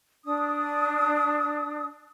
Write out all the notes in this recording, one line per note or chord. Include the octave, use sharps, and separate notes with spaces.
D4 D#6